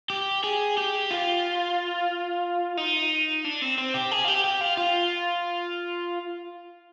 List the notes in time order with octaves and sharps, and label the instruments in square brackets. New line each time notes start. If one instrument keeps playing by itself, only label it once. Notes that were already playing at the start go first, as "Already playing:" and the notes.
[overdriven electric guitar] G4
G#4
G4
F4
D#4
D4
C4
C4
G4
G#4
F4
G4
G4
F4
F4